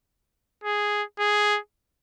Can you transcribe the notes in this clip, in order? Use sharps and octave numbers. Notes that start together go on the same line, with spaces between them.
G#4
G#4